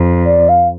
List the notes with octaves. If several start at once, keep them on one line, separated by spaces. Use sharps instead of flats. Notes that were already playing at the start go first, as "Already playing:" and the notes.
Already playing: F2
D5
F5